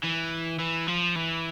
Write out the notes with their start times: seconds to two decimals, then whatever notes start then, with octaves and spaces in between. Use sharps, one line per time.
0.04 E3
0.60 E3
0.88 F3
1.16 E3